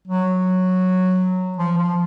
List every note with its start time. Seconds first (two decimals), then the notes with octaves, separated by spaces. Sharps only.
0.08 F#3
1.58 F3
1.77 F3